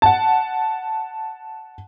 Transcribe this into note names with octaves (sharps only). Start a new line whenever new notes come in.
F#5 A5